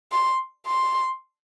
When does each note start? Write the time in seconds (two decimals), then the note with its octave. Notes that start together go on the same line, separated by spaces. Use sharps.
0.12 C6
0.67 C6